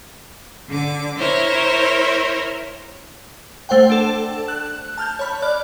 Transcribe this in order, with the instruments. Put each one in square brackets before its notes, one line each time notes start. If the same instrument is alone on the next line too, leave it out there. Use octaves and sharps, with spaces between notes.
[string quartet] D3 D6
E4 A#4 C5 C#5
[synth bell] A3 C5 F#5 G5
D4 A4
F#6
A5 F6 G6
C#5 B5
D5 F6 F#6